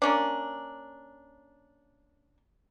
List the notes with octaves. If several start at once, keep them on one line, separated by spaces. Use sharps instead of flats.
A#3 C#4 D4